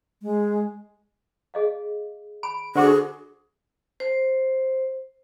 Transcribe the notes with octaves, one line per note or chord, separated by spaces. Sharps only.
G#3
G#4 D#5 F5
B5 D7
D3 F#4 G#4 C5 D6
C5